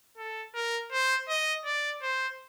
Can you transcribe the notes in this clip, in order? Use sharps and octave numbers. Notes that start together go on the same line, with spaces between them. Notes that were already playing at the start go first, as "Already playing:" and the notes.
A4
A#4
C5
D#5
D5
C5